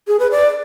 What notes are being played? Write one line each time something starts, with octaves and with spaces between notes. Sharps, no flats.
G#4
B4
D5